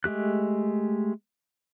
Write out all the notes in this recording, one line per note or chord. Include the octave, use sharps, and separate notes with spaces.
G#3 A3 G4 F#6